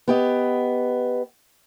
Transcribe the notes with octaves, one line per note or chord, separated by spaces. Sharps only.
B3 G4 D#5